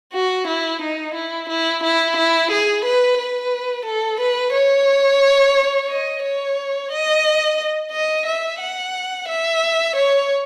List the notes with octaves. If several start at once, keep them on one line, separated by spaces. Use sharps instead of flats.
F#4
E4
D#4
E4
E4
E4
E4
G#4
B4
B4
A4
B4
C#5
D#5
C#5
D#5
D#5
E5
F#5
E5
C#5